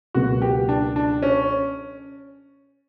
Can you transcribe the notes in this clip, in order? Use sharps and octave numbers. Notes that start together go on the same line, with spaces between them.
C#2 B2 F#3 A#3 F#4
G4
D4
D4
C#4